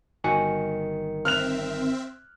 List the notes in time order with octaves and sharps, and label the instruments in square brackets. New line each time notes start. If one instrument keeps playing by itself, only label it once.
[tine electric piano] G1 D#3 C#7 [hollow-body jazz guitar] G2 F#4 G#5
[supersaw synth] C4 E5 [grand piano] F6 F#6 F7